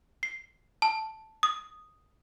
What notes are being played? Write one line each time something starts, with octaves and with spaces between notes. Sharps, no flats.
C7
A5
D#6